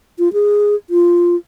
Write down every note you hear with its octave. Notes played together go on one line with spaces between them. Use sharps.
F4
G#4
F4